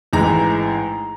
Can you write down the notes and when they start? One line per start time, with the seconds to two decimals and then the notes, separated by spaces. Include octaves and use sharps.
0.13 A1 G#2 E3 G#3 A#5